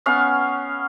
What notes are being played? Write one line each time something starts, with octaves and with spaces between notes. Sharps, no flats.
B3 C#4 F5